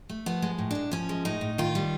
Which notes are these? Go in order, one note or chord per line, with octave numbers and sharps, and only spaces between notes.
A3
F3 B3
G#3
A2
A2 D4
F3 C#4
G#3
A2 D#4
A2
D#3 F4
G3